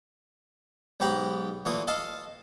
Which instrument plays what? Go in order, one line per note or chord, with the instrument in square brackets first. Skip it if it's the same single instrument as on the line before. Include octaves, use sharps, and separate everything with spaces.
[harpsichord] B1 G#2 G4 G5 A#5 B5
A#2 E3 A3 A#3 D#6
A4 D#5 F5 A5